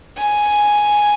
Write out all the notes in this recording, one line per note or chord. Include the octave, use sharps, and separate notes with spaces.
G#5